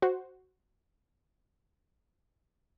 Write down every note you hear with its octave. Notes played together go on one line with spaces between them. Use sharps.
F#4 C5